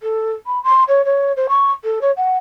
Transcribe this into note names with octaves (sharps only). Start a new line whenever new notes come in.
A4
B5
C6
C#5
C#5
C5
C#6
A4
C#5
F#5